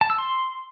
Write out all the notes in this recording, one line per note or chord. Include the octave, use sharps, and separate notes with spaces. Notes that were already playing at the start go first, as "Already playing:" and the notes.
A5
E6
C6